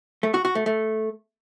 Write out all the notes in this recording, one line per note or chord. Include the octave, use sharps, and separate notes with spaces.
A3
F#4
F#4
A3
A3